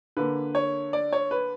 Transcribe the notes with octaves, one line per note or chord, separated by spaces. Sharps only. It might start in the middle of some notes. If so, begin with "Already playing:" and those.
D3 A#3 B4
C#5
D5
C#5
B4